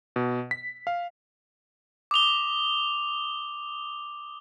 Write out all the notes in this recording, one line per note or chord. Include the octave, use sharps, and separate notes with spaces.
B2
B6
F5
D6 D#6 F7 G7